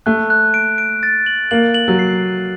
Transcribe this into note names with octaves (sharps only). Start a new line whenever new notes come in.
A3 F#6
F#6
D7
D7
A6
F#7
A#3 F#7
F#7
F#3
C7